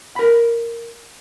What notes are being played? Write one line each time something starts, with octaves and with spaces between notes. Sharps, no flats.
A#4 B5